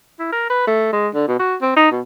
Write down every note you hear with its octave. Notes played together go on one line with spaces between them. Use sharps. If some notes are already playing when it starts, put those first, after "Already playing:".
E4
A#4
B4
A3
G#3
D3
B2
F#4
C4
D#4
B2